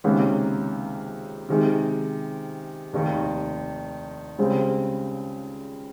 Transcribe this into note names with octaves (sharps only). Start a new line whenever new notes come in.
C#2 C3 D#3 A#3 C#4
C3 D#3 G#3
F1 D#2 D#3
C#2 C#3 G3 C4